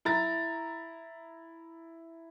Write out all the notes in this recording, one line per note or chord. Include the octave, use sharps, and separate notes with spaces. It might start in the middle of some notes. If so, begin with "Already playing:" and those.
E4 A#5 A6